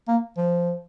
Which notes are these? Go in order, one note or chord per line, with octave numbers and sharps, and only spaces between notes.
A#3
F3